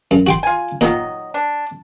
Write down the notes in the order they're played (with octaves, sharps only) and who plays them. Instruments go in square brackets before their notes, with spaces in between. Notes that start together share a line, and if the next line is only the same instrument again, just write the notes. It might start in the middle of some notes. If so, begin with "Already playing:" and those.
[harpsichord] F#2
F#4 G5 C6
[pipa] F4 G#5
[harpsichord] A#2 [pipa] D#3 F#3 D#5
[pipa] D4